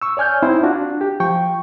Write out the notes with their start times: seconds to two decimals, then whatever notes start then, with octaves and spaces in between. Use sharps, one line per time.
0.02 C#6 E6
0.17 C#5 D5 G#5 F6 G6
0.42 C4 D#4 E4 C5
0.63 D4 F4 F#4
1.01 G4
1.20 F3 G5 C#6